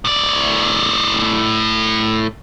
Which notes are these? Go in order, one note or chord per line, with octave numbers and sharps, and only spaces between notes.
A2 D5